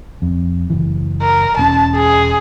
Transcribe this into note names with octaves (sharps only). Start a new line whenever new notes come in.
F2
F#1 E3
A#4
E1 C4 C#4 A5
G#4